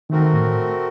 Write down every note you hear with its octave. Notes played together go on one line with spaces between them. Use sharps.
D#3 A3 C4 F#4 A#4
A2